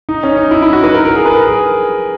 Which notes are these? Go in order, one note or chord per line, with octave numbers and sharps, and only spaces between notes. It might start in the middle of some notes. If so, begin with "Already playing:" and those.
D#4
C#4
D#4
E4
E4
F#4
B4
A#4
A#4
G#4
B4
A#4
G#4